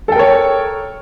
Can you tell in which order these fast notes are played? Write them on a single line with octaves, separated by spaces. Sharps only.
A4 G5 A#4 C#5